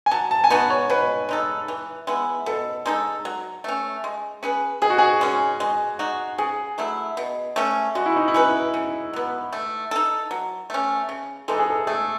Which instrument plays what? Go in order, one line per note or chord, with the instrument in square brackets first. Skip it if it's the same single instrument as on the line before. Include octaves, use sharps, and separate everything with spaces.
[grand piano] G#5
[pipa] F#3 [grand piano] A5
[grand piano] A5
G#5
[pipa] B3 D#4 F#4 [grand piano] A5
[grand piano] C#5
[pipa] B2 [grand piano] B4
[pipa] G#3 D#4 A4
E3
G#3 B3 E4
[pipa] B2 [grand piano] A4
[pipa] G#3 D#4 A4
F#3
A3 C#4
G#3
C#4 G#4 B4
[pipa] B2 [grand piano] G#4
[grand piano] F#4
G#4
[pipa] G#3 C#4
G#3
D#4 F#4
[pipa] C#3 [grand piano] G#4
[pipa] F#3 A3 E4
B2
A3 C#4
[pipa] G#3 [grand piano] F#4
[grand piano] E4
D#4
E4
[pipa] C#4 G#4 B4
C#3
F#3 B3
A3
D#4 A4
F#3
A3 C#4
C#3
[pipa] E3 G#3 D#4 [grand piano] A4
[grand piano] G#4
A4
[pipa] A3 [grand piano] G#4